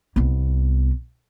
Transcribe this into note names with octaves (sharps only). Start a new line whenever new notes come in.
C2 B3